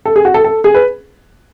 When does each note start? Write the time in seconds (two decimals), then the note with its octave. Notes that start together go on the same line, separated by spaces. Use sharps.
0.05 A4
0.16 G#4
0.25 F#4
0.34 A4
0.44 A4
0.64 G#4
0.74 B4